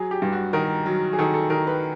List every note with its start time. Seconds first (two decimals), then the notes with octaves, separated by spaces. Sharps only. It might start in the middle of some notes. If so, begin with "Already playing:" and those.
Already playing: F#3 G#4
0.11 G4
0.22 G2
0.32 F#4
0.53 D#3 A#4
0.86 F#3
1.13 G#4
1.18 D#3 A4
1.34 A4
1.50 D#3 A#4
1.67 B4